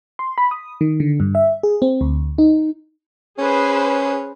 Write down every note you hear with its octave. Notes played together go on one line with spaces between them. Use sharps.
C6
B5
D#6
D#3
D3
G2
E5
G#4
C4
D2
D#4
C#4 G#4 B4 C5